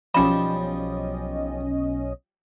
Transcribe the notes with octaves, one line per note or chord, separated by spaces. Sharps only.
B1 F3 G3 C#4 D#5 B5